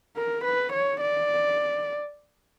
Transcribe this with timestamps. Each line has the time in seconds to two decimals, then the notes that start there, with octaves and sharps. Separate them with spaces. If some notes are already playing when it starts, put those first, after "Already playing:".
0.17 A#4
0.44 B4
0.73 C#5
1.01 D5